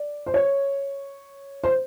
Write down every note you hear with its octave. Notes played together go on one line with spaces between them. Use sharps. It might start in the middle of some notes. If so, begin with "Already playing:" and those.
Already playing: D5
C5
C#5
C5